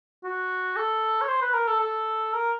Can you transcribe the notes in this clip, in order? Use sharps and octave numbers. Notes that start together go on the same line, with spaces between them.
F#4
A4
C#5
C5
B4
A#4
A4
A4
A#4